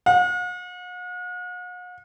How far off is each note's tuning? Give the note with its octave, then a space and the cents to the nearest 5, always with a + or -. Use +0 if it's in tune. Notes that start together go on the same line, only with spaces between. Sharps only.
F#5 -45